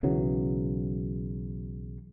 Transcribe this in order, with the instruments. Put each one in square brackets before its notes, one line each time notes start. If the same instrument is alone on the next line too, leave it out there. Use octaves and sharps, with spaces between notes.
[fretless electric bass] B1 C#3 E3 F#3